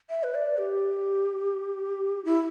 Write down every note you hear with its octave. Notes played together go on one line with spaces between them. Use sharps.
E5
B4
D5
G4
E4